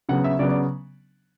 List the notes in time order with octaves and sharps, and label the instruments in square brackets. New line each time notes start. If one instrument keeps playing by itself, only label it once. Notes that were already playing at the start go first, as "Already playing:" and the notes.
[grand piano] C#3 F#3 B3 F#5
E5
C#3 F#3 B3 D5
D5